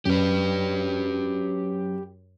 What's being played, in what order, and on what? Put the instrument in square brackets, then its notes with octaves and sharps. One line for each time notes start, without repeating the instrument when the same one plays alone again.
[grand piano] F#2 [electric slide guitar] G4 B4